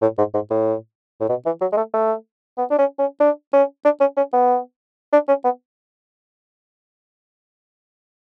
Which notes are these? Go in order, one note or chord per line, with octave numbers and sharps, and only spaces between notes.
A2
G#2
G#2
A2
A2
B2
E3
F#3
G#3
A3
A3
B3
D4
C#4
C#4
D4
C#4
D4
C#4
C#4
B3
D4
C#4
B3